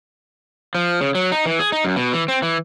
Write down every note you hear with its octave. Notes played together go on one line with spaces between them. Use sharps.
F3
C#3
F#3
D#4
E3
G#4
D#4
F#2
B2
E3
C4
E3